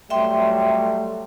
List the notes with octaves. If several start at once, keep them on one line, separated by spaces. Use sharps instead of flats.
F#3 G3 A3 E5 G5 C6